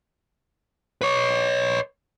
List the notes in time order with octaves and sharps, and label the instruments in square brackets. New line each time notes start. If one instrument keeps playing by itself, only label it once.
[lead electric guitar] B4 C#5